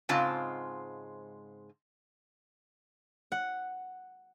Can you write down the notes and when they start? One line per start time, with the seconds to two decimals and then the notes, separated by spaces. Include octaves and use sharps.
0.09 G#2 C#3 G#3 C4 F4 A5
3.32 F#5